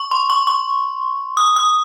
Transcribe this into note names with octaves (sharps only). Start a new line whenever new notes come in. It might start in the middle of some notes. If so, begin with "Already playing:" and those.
Already playing: C#6
C6
C#6
C#6
D#6
D#6